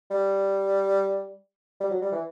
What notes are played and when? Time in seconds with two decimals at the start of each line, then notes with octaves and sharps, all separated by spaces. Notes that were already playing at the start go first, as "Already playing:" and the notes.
0.10 G3
1.80 G3
1.90 F#3
2.01 G3
2.12 E3